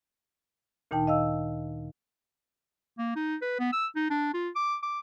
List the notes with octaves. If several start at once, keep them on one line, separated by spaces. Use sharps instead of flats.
D2 A#2 D#3 D#4 G5 A5
D#5 F5 E6
A#3
D#4
B4
B3
E6
D#4
D4
F4
D6
D6